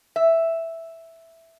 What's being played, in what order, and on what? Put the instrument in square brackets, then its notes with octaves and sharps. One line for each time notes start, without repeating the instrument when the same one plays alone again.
[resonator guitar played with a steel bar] E5